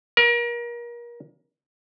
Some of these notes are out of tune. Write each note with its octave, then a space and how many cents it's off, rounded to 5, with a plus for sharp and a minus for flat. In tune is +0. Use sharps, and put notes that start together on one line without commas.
A#4 +35